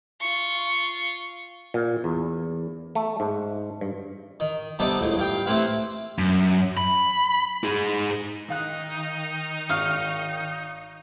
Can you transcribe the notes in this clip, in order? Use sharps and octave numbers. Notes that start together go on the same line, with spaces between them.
F4 C#6
A#2
E2
A3
G#2
G2
D#3
C3 G3 B3 D4 D#4 A4
C#2 A2
G2 F5 G5
C3 A3 C4 E4 B4 F5
F#2
B5
D#4 G#4
D#3 D#4 F5 F#6
G#1 F5 C#6 D#6 F6